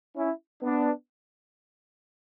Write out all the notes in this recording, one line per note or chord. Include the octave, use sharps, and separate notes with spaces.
C#4 E4
B3 D4